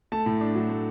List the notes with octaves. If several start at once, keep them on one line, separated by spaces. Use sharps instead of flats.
A3 A5
A2
D4
F#3
A3